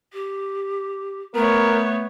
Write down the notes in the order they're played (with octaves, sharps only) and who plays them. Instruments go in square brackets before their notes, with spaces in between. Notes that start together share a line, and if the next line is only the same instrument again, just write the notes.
[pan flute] G4
[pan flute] A3 [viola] B3 C#5 [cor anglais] A#4